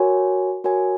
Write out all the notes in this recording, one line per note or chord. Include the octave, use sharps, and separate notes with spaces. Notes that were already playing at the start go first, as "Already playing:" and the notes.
Already playing: F#4 A#4 C#5 G#5
F#4 A#4 C#5 G#5